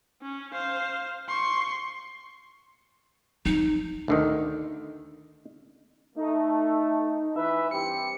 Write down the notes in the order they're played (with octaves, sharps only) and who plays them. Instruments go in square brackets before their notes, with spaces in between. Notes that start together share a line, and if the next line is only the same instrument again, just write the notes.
[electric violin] C#4
C5 F5
C6 C#6
[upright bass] F3 [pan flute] D#4
[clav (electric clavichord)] D2 D3 D#3
[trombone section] A3 [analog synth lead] D#4
[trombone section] E3 B4 [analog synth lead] E5
[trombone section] G2 C4 G4 [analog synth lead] C#7